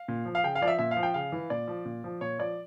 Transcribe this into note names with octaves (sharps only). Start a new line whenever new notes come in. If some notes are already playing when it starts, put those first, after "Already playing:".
Already playing: F5
A#2
F3
F5
C#3 G5
F5
F3 D5
E5
A#2 E5
F5
F3
G5
C#3 F5
E3
A#2 D5
F3
A#2
F3
A#2 C#5
F3 D5